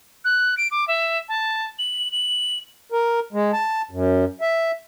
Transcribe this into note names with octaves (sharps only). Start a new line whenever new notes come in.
F#6
D7
D6
E5
A5
F#7
F#7
A#4
G#3
A5
F#2
E5